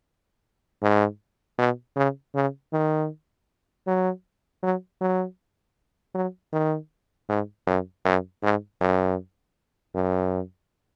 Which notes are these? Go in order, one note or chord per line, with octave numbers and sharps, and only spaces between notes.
G#2
B2
C#3
C#3
D#3
F#3
F#3
F#3
F#3
D#3
G#2
F#2
F#2
G#2
F#2
F#2